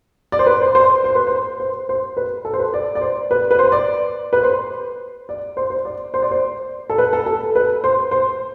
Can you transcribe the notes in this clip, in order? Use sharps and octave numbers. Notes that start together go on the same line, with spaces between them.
D5
C5
B4
C5
C5
C5
B4
C5
C5
C5
B4
A4
C5
B4
D5
D5
C5
B4
B4
C5
D5
B4
C5
D5
C5
C5
D5
C5
D5
C5
A4
B4
A4
A4
B4
C5
C5